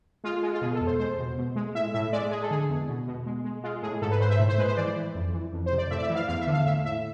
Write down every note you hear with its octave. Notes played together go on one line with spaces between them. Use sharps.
G#3 F4
G#3
F4
B2 G#4
A4
E2
C5
G#3 C5
B2
B2
G#3
A2 E5
A2 E5
G#3 D5
G#3 G#4
A4
D3 G#4
E2
B2
B2
G#3
G#3
G#3 F4
A2 G#4
G#2 A4
B4
G#2 C5
E5
A2
C5
G#3 B4
C5
E3 D5
E3
F2
E3
F2
C5
C3
D5
A2 E5
D5
E5
E3
F5
E2 F5
E5
D3
F5
A2 E5
A2 E5